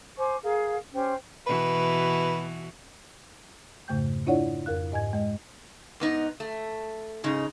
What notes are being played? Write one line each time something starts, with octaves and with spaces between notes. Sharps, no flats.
C5 G#5 C#6 D6
G#4 A#4 F5
C#4 G4 C5 G5
B2 E3 F#4 B4
F2 G#2 C#3 A3 G5 G6
D4 E4 F4 C#5 D5 F#5
F2 A#4 F5 F#6
G#2 D#5 G#5 G#6
G#3 D#5
G#2 B3 D#4
A3
G#2 C#3 D#4